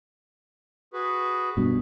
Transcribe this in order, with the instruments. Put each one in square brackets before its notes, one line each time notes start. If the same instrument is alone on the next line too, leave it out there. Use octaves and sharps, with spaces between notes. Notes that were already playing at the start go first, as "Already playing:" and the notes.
[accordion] F#4 G#4 B4
[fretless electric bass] G2 B2